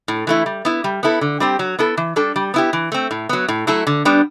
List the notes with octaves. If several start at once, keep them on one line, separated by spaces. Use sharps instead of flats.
A2
E3 A3 E4
G3
B3 E4
G3
B3 E4 A4
D3
G3 C4 G4
F#3
B3 E4 A4
E3
G3 D4 A4
G3
B3 E4 G4
E3
A3 C4
A2
F#3 B3
A2
F#3 A3 E4 A4
D3
G3 B3 D4